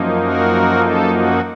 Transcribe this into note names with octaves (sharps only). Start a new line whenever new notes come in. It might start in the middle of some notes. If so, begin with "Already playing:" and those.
Already playing: F#2 F3 A#3 D#4
F#4 A#4
A4
F#4